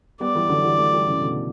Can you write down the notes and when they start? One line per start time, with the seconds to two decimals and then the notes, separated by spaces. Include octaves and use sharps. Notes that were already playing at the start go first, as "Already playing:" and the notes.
0.20 G3 B3 D5
0.35 E3 G3
0.49 D3 F#3
0.64 E3 G3
0.78 F#3 A3
0.93 E3 G3
1.07 C#3 E3
1.22 B2 D3